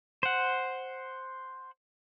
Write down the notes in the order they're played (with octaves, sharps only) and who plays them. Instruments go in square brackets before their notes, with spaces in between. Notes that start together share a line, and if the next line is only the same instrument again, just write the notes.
[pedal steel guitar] C5 F#5